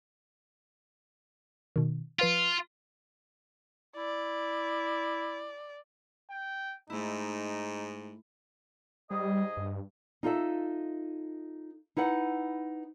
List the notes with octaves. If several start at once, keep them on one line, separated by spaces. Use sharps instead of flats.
B2 D#3
F3 F4 B4 F5
E4 D5
G5
G#2 A3 D#4 E4
G#2 G3 G#4 D#5
G2
D#4 F4 A4 E5
D#4 E4 B4 F#5